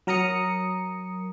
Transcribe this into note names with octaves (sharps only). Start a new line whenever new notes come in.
F#3 A#4 A#5 D#6 C#7